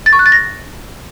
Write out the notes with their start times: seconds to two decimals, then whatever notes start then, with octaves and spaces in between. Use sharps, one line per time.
0.06 A6
0.13 C#6
0.19 F#6
0.26 A6
0.32 A#6